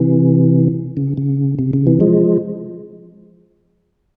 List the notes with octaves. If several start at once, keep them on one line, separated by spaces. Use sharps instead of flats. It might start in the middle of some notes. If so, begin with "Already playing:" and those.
Already playing: C3 E3
C#3
C#3
C3
C#3
C3 E3
F3 G#3